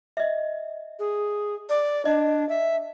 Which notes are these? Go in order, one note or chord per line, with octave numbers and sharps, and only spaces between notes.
D#5 E5
G#4
D5
D4 D#5
E5